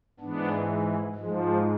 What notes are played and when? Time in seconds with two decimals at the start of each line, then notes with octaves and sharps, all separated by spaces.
0.20 G#2 E3 B3 D4
1.15 G#2 F3 G#3